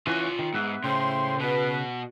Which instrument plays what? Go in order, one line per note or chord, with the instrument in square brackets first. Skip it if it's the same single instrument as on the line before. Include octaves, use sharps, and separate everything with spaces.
[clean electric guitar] E3 C#4 F#4 [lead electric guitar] F4 G#5
[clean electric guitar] D#3
[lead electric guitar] G#2 [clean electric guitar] B3 B4 E5
[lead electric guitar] A2 [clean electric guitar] C#3 [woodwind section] C5 G5 C6
[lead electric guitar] B2 F#4 [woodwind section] B4